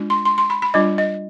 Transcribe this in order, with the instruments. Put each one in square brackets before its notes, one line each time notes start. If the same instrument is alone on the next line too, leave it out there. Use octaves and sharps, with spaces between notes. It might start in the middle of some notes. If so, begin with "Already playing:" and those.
Already playing: [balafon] G#3 D4 F4
C6
C6
C6
B5
B5
G3 D4 F4 D#5
D#5